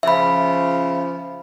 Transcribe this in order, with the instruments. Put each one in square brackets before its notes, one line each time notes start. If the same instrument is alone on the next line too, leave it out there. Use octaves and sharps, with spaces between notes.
[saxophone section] C#3 F3 [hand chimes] E5 B5